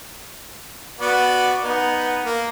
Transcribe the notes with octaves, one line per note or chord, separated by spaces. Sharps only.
B3 F#4 D5
B3 D#4
A#3